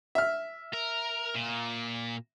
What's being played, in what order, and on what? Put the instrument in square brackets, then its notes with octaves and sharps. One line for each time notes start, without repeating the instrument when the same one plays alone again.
[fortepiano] E5 F6
[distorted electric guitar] A#4
A#2